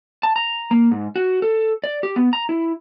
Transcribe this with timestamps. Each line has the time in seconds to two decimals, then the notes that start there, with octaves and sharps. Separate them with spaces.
0.23 A5
0.36 A#5
0.71 A#3
0.91 G#2
1.16 F#4
1.42 A4
1.84 D5
2.03 G4
2.16 B3
2.33 A#5
2.49 E4